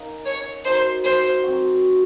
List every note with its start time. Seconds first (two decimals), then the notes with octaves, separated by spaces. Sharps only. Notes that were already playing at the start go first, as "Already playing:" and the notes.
Already playing: C#4 D#4 A#4 D#5 F5
0.26 C#5
0.65 D#4 F#4 A#4 C5
1.04 C5
1.43 F#3 C4 F#4